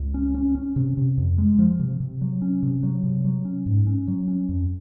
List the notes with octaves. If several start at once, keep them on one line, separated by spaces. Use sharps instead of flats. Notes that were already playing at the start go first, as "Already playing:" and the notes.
Already playing: C#2
C#4
C#4
C#4
C3
C3
F2
G#3
F3
C3
C3
F#3
C#4
C3
F#3
C3
F#3
C#4
G#2
C#4
F#3
C#4
F2